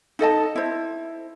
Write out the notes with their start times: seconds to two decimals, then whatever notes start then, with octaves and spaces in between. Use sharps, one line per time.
0.19 D#4 A4 D#5 A5
0.56 E4 C5